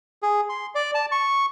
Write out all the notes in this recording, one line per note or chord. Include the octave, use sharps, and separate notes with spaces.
G#4
C6
D5
A5
C#6